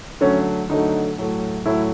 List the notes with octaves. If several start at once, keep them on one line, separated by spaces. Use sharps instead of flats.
D3 F#3 A3 C#4
D3 F#3 A3 D#4
A2 F#3 A3
A2 F#3 A3 E4